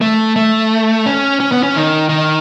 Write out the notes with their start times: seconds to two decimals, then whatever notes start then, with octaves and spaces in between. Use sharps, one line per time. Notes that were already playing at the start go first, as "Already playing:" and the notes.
0.01 A3
0.36 A3
1.06 C#4
1.40 C#4
1.52 B3
1.63 C#4
1.74 D#3
2.09 D#3